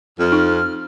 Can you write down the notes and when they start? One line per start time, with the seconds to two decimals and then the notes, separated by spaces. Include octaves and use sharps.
0.20 F2 F6
0.32 D#4